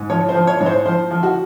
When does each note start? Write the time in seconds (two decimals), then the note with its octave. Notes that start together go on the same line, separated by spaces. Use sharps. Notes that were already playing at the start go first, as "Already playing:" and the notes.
Already playing: G#2
0.10 F3 C#5
0.29 C5
0.35 F3
0.47 C#5
0.60 G#2 C#5
0.66 C5
0.85 F3 C5
1.11 F3
1.23 F#4